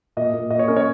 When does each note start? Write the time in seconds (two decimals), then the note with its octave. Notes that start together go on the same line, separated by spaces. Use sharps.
0.17 A#2 D#5
0.34 A#2
0.50 A#2 D#5
0.59 C#5
0.68 C#4 A#4
0.77 C#5